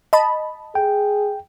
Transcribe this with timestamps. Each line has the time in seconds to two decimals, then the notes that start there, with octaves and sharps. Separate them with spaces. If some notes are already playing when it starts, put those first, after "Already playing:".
0.13 D#5 A5 B5
0.75 G#4 G5